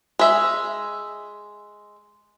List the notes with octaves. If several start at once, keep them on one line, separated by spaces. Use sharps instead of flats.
G#3 E5